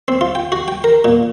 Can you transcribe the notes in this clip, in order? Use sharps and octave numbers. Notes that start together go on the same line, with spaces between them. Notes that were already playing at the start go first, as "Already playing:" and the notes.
C4
F4
G5
F#4
G5
A#4
A#2